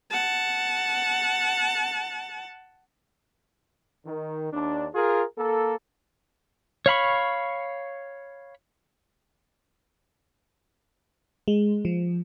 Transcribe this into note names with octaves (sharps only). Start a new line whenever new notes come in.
F#5 A5
D#3
D#2 D4
F4 G#4 A#4
A#3 A4
C#5 F5 B5 C#6
G#3
F3